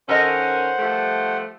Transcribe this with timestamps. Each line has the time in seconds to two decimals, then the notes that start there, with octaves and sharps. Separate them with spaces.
0.09 D#3 C#4 A4 A#4 C5 D#5 F#5
0.79 F3 G3 A3